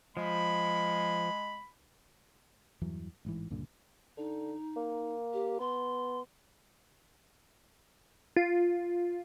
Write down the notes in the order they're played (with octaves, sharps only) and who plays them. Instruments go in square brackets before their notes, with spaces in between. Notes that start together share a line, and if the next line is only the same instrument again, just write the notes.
[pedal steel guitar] F3 [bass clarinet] G#3 [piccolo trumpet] B5
[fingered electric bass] E2 G2 E3 F#3
A1 G#2 E3
C#2 G2 A#2 D3
[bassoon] D3 [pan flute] D#4
[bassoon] A#3
[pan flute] G4
[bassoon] B3 [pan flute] C6
[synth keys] F4